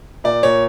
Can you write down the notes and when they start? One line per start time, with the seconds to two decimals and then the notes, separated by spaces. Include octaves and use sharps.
0.24 A#2 D5
0.43 A#2 C#5